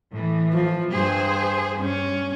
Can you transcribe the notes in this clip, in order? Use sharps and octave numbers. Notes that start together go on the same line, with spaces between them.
A2 E3
F3
G2 G#4 C5
G2 C#4